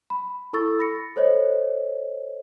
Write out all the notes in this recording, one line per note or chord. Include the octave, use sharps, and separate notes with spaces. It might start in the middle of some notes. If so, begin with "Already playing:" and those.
B5
E4 A4 C#6 E6 A6
B5 A#6 C#7
A4 C5 C#5 D#5